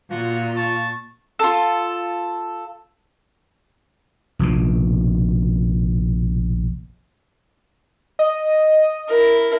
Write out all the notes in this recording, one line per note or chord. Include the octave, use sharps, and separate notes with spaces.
A#2 F4 F#4
A5 C#6
F4 A4
F1 A#1 B2
D#5
E4 A#4